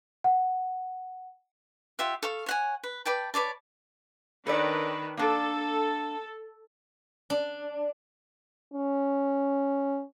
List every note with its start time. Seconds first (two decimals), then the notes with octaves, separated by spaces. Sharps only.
0.24 F#5
1.99 F4 G4 E5 F#5
2.23 A4 F5 C#6
2.46 C#5 F#5 G#5
2.83 B4
3.05 B4 D5 G5 A5
3.34 B4 C#5 D5 A5
4.47 D#3 D4 A4 B4 C#5 D5
5.17 A#3 D4 A4
7.30 D4
8.74 C#4